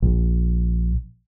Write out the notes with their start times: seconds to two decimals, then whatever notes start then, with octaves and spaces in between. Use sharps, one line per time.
0.02 A#1